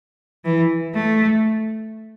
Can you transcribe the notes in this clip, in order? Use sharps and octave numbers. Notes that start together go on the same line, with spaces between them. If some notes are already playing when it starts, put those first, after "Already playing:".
E3
A3